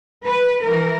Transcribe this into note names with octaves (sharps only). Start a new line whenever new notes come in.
B4
E3 A#4